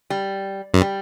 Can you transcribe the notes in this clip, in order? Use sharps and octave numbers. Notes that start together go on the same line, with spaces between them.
G3
F#2
G3